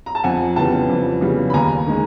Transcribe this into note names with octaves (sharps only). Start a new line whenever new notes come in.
A#5
A5
F2 F#5 G#5
C#3 E3 G3 B3 G5 A5
F2
C#3 E3 G3 B3
B5
D#2 G#5 A#5
D#3 G#3